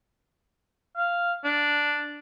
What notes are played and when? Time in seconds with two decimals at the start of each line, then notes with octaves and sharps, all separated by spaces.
0.96 F5
1.44 D4